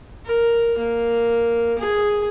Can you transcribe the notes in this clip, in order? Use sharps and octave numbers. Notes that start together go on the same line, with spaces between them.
A#4
A#3
G#4